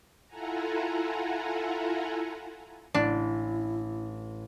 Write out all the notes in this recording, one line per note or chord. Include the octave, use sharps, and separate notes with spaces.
E4 F4 A4 F#5 G#5 A#5
A1 D4 E4